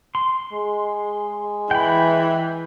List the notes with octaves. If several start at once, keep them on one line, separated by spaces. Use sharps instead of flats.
C6
G#3
E3 G5 B5